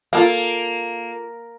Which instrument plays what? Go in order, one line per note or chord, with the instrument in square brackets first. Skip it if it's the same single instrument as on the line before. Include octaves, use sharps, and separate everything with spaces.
[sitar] A#3 [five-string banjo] F4 A4 F5